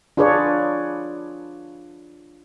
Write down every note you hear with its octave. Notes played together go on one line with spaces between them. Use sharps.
D4 F4 G#4 B4 C#5 D5